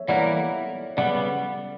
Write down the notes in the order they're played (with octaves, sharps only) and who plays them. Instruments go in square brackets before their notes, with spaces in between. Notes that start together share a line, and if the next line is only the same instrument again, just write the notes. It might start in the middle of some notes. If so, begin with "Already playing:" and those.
Already playing: [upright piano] C#5 E5
[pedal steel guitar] E3 G3 A#3 E4 A#4 [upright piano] D5 F#5
[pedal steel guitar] C#3 G3 B3 [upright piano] D5 F#5